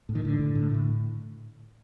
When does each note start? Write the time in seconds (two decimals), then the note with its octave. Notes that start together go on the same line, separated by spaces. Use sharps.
0.09 A2
0.15 D#3
0.24 A2 D3
0.39 A2
0.55 A2
0.71 A2 D3